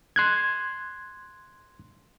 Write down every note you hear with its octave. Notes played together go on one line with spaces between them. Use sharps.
C6 F#6 G#6